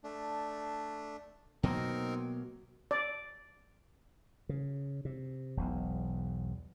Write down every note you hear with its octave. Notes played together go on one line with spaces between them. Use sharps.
A3 D4
B2 F#3 A#3 C4 D#4 A#4
D5
C#3
C3
E1 B1 E2